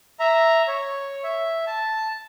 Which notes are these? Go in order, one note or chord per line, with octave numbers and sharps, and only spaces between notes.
E5 A#5
C#5
E5
A5